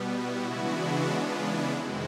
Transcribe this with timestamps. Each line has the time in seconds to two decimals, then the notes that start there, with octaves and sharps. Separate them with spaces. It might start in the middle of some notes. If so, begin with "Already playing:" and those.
Already playing: B2 G3 B3
0.13 E4 F#4
0.45 C#3 E3 G#3 B3 D4
1.09 F4
1.40 E4
1.73 F2 C3 D#3 G#3 C4 E4 F#4